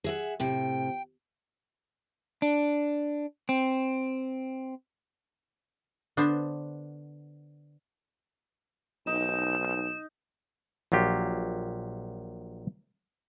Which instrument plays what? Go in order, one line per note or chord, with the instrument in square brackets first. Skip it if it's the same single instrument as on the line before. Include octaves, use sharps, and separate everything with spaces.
[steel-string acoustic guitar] G#4 E5 F#5
[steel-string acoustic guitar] A2 C3 [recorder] G5
[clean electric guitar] D4
C4
[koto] D3 B3 D4 C5
[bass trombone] B1 [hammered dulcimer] D#4 [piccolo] E7
[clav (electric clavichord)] A#1 F#3 F4 G4